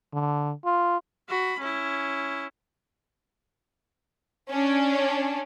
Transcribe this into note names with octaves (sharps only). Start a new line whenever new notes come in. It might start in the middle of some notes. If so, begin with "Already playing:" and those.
D3
F4
F#4 B5
C#4 E4
C#4 D4